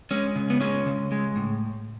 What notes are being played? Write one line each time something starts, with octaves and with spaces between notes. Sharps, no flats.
G#3 C#4
C#3
B3
G#3 C#4
C#3
G#3
A2